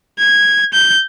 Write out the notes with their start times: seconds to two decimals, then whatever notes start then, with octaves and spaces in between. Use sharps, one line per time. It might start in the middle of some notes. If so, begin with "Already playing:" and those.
0.19 G#6
0.73 G6